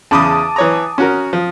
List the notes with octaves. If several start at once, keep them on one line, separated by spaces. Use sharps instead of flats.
E2 C#3 A5 B5 D6 D#6
E3 C#5 A#5
C#4 F#4 A#4
F3